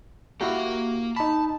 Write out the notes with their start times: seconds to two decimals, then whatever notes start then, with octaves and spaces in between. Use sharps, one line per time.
0.41 A#3 E4 F#4 G4 F5
1.16 D#4 A5 B5